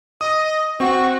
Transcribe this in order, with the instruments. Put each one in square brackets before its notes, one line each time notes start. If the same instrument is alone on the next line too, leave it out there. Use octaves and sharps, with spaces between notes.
[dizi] D#5 [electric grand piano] D#6
[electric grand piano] C4 [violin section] F#4 [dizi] C#6